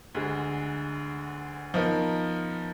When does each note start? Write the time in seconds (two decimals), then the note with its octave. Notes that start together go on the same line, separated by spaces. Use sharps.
0.15 D2 D3 G#3
1.74 F3 B3 D#4 A#4